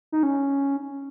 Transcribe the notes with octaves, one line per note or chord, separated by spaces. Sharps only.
D#4
C#4